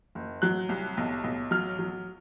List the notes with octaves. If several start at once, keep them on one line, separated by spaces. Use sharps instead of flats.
F#1
F#3 F#6
C2
B1
B1
F#3 F6
F#3